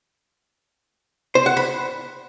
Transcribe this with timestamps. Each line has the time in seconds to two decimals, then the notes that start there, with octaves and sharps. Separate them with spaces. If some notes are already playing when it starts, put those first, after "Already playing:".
1.35 C5
1.46 F#5
1.57 B5